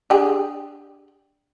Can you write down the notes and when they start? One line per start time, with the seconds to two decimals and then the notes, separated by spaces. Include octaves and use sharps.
0.10 D4 G4 G#4